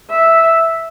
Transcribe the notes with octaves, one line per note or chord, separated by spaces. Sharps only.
E5